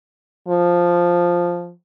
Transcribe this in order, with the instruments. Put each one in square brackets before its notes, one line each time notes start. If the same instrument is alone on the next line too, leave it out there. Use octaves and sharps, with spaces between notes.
[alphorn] F3